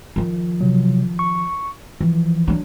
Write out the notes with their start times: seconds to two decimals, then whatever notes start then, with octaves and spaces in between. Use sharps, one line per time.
0.16 D#3 F3
0.61 C3 F#3
1.19 C#6
2.01 E3 F3
2.47 F#3 D4